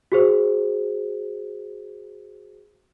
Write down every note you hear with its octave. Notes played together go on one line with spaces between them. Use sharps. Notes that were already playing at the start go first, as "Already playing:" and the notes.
F#4 G#4 C5